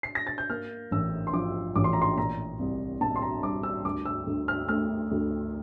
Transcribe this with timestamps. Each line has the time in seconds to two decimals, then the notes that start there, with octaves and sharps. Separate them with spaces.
0.03 C7
0.15 A#6
0.27 A6
0.38 G6
0.50 A#3 F6
0.91 A1 E6
1.27 C6
1.33 F3 D6
1.76 A1 D6
1.84 C6
1.93 A#5
2.02 C6
2.17 A#2 A#5
2.59 C2
3.01 A#2 A5
3.16 C6
3.22 A#5
3.43 G3 D6
3.63 E6
3.85 D2 D6
4.05 E6
4.26 D2
4.48 F6
4.68 A3 F6
5.11 D2